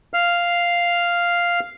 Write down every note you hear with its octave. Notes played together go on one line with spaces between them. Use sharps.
F5 F6